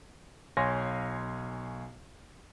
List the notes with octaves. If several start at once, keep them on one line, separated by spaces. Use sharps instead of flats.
B1 C#5 F5 G#5 C6 A#6